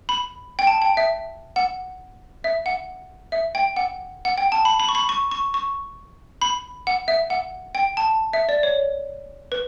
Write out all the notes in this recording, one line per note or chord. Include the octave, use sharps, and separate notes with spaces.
B5
G5
A5
G5
E5
F#5
E5
F#5
E5
G5
F#5
F#5
G5
A5
B5
B5
C#6
B5
C#6
C#6
C#6
B5
F#5
E5
F#5
G5
A5
E5
D5
C#5
B4